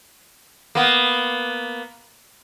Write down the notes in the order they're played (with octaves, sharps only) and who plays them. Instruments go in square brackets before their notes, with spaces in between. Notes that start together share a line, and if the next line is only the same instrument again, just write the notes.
[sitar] A#3 B3